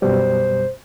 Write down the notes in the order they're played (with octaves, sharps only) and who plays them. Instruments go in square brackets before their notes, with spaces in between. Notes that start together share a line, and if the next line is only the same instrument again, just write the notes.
[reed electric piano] F#2 B2 G3 [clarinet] C5